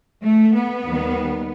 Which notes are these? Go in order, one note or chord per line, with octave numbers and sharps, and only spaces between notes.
A3
B3
D#2 D#3 G3